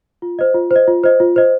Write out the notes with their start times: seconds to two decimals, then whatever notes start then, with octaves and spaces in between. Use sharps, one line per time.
0.22 F4
0.39 C5 D#5
0.54 F4
0.71 C5 D#5
0.88 F4
1.04 C5 D#5
1.20 F4
1.36 C5 D#5